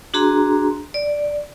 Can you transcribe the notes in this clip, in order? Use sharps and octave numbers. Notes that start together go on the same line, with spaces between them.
D4 F#4 G#4 A#5 C6
D5